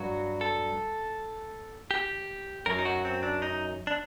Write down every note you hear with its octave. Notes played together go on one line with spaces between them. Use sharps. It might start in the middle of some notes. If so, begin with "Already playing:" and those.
Already playing: G2 F#3 F#4
A4
G4
F#2 F#3 A#4
D#4
F#4
C4
D4
D#4
D4